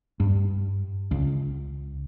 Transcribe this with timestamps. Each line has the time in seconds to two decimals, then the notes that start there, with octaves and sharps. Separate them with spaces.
0.20 G2
1.11 C#2